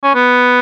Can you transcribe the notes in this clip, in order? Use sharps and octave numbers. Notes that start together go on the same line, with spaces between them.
C#4
B3